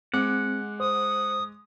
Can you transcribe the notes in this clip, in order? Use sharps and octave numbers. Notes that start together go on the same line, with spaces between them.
G#3 C4 F#5 D6 C#7
C5 D#6